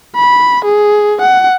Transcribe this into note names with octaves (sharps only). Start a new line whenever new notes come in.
B5
G#4
F#5